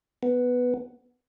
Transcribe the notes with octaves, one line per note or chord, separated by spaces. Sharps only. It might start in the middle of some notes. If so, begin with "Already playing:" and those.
B3